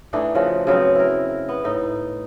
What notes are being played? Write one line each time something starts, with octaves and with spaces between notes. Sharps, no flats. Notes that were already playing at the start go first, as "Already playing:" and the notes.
E3 A3 D4 D#4
C#3 F3 F#4
C#3 F#3 B3 C4
E4 A#4
B3
A2 D#4